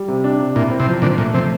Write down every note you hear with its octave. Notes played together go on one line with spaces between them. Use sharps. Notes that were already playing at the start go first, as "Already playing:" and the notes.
Already playing: G3
C3
D4
C3
A#2 E4
C4
C3
F3
A#2 D3 F3
A#2 A3
C3 F3